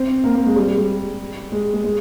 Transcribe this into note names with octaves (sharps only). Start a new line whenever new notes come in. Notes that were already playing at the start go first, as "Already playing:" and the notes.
Already playing: C4
A#3
A#3
G#3
G3
G3
G3
G#3
G#3
G#3